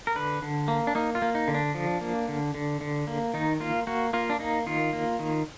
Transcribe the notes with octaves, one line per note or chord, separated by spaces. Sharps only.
A#4
D3 B4
D3
A#3
D4
A#3 D#4
F4
A#3
D#4
D3
D4
F3
A#3
D3
D3
D3
A#3
D#3 D#4
A#3 F4
A#3 F#4
A#3 F4
D4
A#3 D#4
D#3 F4
A#3
D#3